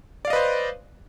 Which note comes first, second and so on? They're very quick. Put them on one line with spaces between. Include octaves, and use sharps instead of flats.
D5 F5 D#5 B4 C5